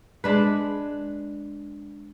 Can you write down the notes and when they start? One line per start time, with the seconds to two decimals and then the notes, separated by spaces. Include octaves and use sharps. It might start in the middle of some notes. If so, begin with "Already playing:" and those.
0.24 G#3 D4 B4